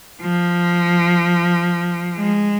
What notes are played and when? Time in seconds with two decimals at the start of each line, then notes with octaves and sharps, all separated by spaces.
0.22 F3
2.18 G#3